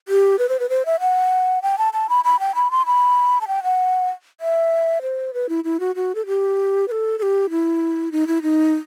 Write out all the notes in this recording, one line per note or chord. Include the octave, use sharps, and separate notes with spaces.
G4
B4
C5
B4
C5
E5
F#5
G5
A5
A5
B5
B5
G5
B5
C6
B5
A5
G5
F#5
E5
C5
B4
E4
E4
F#4
F#4
A4
G4
B4
A4
A4
G4
E4
D#4
E4
D#4